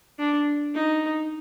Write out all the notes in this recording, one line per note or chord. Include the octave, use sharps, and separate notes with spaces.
D4
D#4